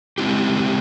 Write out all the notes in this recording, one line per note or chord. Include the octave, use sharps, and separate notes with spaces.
G#3 C4 E4 G4